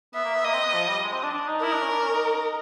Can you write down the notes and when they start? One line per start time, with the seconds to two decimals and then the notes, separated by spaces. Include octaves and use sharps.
0.14 B3 E5
0.24 A#3
0.34 B3
0.44 A#3 D#5
0.54 C4
0.64 B3
0.74 F3
0.88 G3
0.99 G3
1.03 G#3
1.13 C4
1.23 D4
1.33 D4
1.48 D#4
1.62 E4 A#4
1.73 D4
1.82 C#4
1.92 D4
2.02 C#4
2.12 D#4